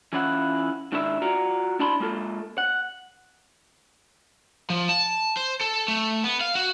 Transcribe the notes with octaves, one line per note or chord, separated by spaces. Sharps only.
E3 C#4 E4 F4 F#5
G#2 D#3 D4 E4 A#4 E5
F4 F#4 D5 A#5
D4 E4 D5 A5 B5 C6
G#3 A#3 F4 A4
F#5
F3
A5
C5
A4
A3
B3
F5
F#4